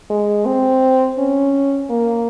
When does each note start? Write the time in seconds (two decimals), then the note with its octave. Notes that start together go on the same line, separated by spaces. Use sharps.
0.10 G#3
0.46 C4
1.18 C#4
1.91 A#3